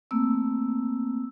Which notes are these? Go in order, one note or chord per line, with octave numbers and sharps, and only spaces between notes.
A3 A#3 C4 E6